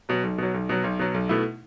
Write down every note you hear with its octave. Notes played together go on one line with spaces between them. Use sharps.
B2 F#3
B1
B2 F#3
B1
B2 F#3
B1
B2 F#3
B1
B2 A3 E4